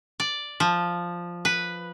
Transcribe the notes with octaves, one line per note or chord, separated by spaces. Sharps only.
D5
F3
B4